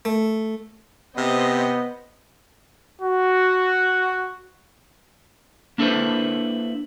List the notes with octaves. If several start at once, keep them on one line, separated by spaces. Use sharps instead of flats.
A3
C3 B3 C5 D#5
F#4
A#3 D4 E4 A4 B4 C5